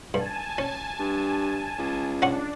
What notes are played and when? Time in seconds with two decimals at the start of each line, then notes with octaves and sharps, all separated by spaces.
0.14 G2 G#5 A5
0.58 C#4
0.99 G2
1.78 C#2
2.22 C#4 D4 F#5 C#6